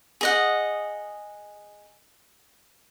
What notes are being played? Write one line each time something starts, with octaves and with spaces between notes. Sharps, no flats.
G#4 D#5 F#5